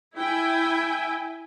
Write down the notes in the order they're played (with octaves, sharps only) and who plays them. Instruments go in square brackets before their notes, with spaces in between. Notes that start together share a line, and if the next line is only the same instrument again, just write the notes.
[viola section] E4 G5 G#5